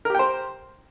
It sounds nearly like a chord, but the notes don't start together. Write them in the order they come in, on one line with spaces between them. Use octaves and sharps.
A#4 G4 G5 C5